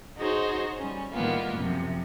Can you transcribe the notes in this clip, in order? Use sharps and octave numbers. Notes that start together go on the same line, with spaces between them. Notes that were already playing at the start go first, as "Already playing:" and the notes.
D#4 F#4 G#4 C5 C#5
G3 C#4
A2 D#3 G3 A#3 B3 F4
F#2 C3 F3